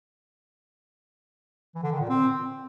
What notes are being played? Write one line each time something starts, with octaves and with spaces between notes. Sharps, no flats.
E3
D3
D#3
A#2
C4